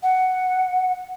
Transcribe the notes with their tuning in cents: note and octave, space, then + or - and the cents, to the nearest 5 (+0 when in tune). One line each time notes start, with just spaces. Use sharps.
F#5 +5